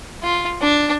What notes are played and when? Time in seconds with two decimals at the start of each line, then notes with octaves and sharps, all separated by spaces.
0.23 F4
0.62 D4